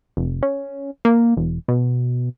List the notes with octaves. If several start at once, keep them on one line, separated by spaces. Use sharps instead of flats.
F1
C#4
A#3
E1
B2